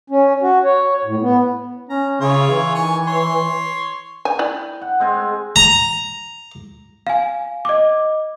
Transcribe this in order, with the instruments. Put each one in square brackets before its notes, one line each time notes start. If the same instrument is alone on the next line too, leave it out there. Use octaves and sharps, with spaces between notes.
[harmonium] C#4
F#4
C#5
A2
B3
[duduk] C#4 [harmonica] A#5
[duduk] C#3 [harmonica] E4 F4 C#5
[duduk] E3
[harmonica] D#3 G#5 C#6
C#5 C6
[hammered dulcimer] G5 [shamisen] G#5
[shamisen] E4 D5
[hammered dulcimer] F#5
G#3 C4 G#5
[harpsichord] A#5
[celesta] F5 G#5
D#5 D6